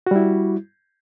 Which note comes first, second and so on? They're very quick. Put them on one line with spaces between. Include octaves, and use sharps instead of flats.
F#4 G3 E4